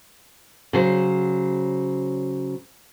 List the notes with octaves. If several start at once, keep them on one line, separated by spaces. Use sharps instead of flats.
C#3 F#3 C5